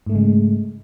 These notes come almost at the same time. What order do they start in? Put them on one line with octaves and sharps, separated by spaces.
G#2 A3 C#3 G#3